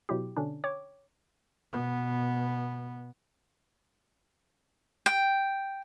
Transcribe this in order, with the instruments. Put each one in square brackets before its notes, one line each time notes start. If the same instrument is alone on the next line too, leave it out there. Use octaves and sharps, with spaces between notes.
[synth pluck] B2 F#3 E4 G4
B2 D3 C#4 D4
C#5 G5 D6
[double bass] B2 B3
[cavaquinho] G5